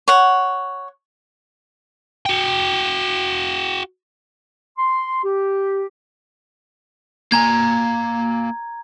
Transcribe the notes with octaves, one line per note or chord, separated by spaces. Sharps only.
C#5 F#5
F#4 G5
C6
G4
A#3 G#5 A#5 G#6